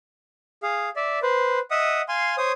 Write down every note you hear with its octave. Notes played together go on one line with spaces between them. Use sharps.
G#4 F5
D5 E5
B4 C5
D#5 E5 F#5 D#6
F5 G#5 C6
C5 C#5 D#6